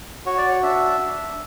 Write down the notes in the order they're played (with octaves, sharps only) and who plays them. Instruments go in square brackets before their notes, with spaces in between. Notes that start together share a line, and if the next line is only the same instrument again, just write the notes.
[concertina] F#4 C#5
D5
C#5
D4 E5
D4